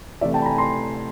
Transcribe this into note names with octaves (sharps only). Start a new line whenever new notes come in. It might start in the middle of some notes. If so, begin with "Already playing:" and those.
C3 E3 A3 D5 E5
G5 A5
B5
G#5 A#5
A#5 C6